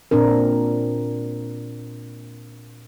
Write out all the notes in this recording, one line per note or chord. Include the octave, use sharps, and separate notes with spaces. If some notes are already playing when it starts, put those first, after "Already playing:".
A#2 C4 D4 A#4